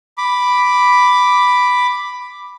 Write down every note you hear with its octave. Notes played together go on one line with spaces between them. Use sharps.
B5 D6